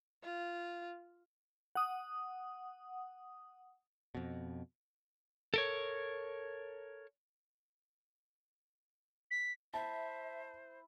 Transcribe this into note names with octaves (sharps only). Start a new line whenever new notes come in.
F4
F#5 D#6
F2 B2
A4 A#4 C#5
B6
E4 C5 E5 A5